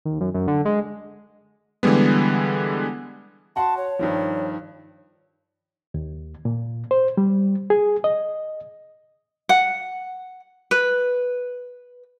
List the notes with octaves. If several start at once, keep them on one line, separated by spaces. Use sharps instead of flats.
D#2
F#2
F#2
D3
G#3
D3 E3 G3 G#3 B3
F#4 F#5 A5 C6
C#5
G2 D#3 F3
D#2
A#2
C5
G3
G#4
D#5
F#5
B4